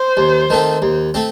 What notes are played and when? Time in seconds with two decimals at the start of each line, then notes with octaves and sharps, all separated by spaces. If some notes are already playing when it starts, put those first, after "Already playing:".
Already playing: C5
0.17 D#2
0.50 D#3 A3 C4
0.82 D#2
1.14 A3 C4